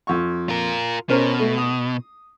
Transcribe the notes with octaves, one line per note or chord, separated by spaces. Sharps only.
F2 C#6
F4 A#4
B2 C#4 A#4 C5
A3
D#6